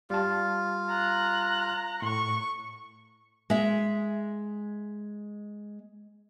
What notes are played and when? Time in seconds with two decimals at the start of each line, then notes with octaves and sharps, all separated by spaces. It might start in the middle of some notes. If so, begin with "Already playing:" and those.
0.10 G3 F4 A5
0.89 A#5 F#6
2.02 A2 C#6
3.50 G#3 E5